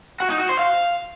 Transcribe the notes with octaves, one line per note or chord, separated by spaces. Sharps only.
F#4
D#4
F#4
C5
F5